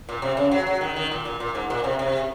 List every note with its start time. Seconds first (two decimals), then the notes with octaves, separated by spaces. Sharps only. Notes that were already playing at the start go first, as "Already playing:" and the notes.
0.09 A#2
0.22 C3
0.37 C#3
0.51 F#3
0.67 F#3
0.81 D#3
0.96 D#3
1.11 A#2
1.25 A#2
1.40 A#2
1.55 G#2
1.70 A#2
1.84 C3
1.99 C3